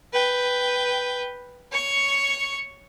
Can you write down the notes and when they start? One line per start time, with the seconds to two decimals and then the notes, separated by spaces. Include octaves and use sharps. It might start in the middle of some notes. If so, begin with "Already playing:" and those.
0.13 B4 G5
1.72 C#5 C#6